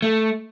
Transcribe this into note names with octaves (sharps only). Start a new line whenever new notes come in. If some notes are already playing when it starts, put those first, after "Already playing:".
A3